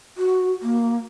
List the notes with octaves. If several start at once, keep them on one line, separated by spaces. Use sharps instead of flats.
F#4
A#3